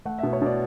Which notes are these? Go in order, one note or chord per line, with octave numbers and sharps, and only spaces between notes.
A3 F#5
B2 E5
C#5
B2 D5